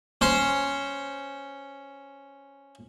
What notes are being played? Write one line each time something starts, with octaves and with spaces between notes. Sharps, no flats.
C#4 C5